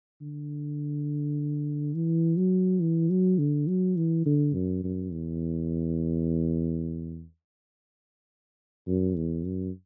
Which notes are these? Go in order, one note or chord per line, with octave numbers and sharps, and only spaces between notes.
D3
E3
F#3
E3
F#3
D3
F#3
E3
D3
F#2
F#2
E2
F#2
E2
F#2